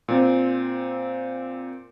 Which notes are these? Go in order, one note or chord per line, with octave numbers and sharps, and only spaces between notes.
A#2 C4